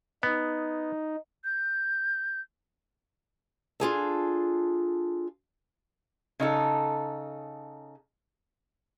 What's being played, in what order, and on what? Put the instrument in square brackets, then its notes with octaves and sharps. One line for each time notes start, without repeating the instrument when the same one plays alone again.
[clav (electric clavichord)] B3 [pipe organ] D#4
[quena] G6
[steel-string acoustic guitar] D4 F4 G#4 A4
[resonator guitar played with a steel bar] C#3 D#4 A4